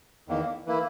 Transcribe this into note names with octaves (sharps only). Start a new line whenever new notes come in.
E2 D#3 A#3
E3 A#3 E4